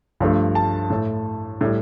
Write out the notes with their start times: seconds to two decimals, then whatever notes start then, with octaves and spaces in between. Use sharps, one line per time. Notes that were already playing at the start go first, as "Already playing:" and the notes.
0.20 G2 F3 A3
0.55 A5
0.90 A2 A3
1.61 A2 G3